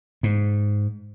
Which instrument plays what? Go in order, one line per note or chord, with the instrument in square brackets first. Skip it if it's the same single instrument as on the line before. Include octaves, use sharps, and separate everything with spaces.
[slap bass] G#2